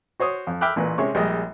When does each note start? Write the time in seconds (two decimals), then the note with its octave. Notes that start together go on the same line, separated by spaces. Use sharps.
0.20 F#4 C5 C#5 D#6
0.47 F2
0.61 E5 G5 B5 D6 F6 F#6
0.76 A1 A#2 B4
0.98 C3 G#3 C#4 C#5
1.15 A#1 G3 G#3 D#5